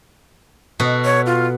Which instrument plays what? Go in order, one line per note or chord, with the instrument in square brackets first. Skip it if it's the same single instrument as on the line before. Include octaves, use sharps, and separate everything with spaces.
[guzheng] B2 F#4 A4
[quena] C#5
F4